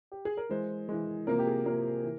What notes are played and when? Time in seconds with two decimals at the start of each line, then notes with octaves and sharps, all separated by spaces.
0.12 G4
0.25 G#4
0.37 A#4
0.49 E3 G#3 C5
0.89 E3 G#3
1.27 C3 F3 A#3 A#4
1.39 G4
1.47 G#4
1.65 C3 F3 A#3 A#4
2.04 E3